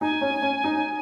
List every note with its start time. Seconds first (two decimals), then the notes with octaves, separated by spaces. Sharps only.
0.01 D#4 G#5
0.21 C#4
0.42 C#4
0.64 D#4